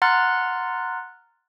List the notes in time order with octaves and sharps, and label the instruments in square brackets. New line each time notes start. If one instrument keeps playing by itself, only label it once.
[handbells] F#5 A#5 C6 F6 F#6 A6